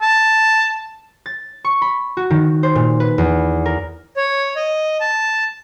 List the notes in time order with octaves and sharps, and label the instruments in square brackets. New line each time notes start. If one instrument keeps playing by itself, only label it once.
[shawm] A5
[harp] A6
C#6
B5
F#4
D#3
C5
A#2
B4
E2
A#4
[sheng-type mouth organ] C#5
D#5
A5